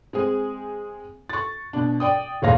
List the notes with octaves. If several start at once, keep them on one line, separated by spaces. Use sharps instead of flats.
G#3 C4 G#4
C#6 A6
B2 D4
D5 G5 D#6
E1 A#2 A3 C#5 F5 A#6